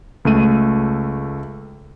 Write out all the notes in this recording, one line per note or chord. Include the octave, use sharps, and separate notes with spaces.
C#2 A3 D#7